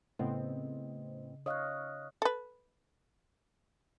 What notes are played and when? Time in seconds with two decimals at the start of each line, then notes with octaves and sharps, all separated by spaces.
0.19 A2 C#3 B3 C4 D#5
1.46 C#5 D#5 F5 D#6 F6 F#6
2.22 A4 B4